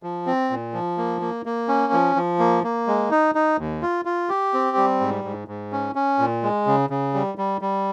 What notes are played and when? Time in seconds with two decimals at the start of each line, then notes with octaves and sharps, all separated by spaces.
0.03 F3
0.26 C4
0.50 A#2
0.74 F3
0.98 A#3
1.21 A#3
1.46 A#3
1.68 C#4
1.93 F3
2.16 F3
2.39 A#3
2.64 A#3
2.87 G#3
3.11 D#4
3.35 D#4
3.59 D#2
3.82 F4
4.05 F4
4.29 G4
4.53 C4
4.77 G3
5.00 G#2
5.24 G#2
5.48 G#2
5.72 C#4
5.95 C#4
6.19 A#2
6.43 G#3
6.66 C#3
6.90 C#3
7.14 G3
7.38 G3
7.61 G3